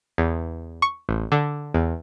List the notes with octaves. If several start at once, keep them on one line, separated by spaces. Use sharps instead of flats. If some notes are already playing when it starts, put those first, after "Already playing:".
E2
C#6
A1
D3
E2